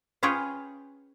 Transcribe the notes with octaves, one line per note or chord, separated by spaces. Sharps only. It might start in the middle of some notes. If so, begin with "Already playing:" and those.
C#4 F4 G#4 B4 C#5 G5